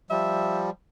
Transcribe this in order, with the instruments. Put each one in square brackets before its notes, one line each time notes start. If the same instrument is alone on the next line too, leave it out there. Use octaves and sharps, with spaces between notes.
[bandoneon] F3 G3 [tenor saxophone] E5